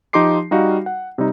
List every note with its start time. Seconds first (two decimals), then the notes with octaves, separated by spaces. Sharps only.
0.13 F3 D#4 G4 C6 D6 C7
0.51 G3 D#4 F#4 F5
0.86 F#5
1.18 C3 G3 D#4